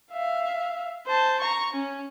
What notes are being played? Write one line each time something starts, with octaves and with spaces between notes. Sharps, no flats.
E5 F5
C5 A5
A#5 C#6
C#4